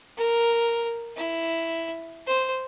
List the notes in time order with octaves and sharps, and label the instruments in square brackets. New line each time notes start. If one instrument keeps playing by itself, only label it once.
[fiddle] A#4
E4
C5